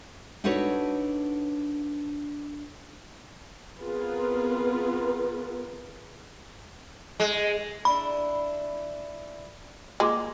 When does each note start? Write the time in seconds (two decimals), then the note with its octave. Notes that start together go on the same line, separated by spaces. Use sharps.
0.44 D4 D#4 F#4 A4 B4 C#5
3.79 B3 C4 F4 G#4 A#4 B4
7.20 G#3
7.85 D4 E4 B5
10.00 G#3 A#3 F4 D6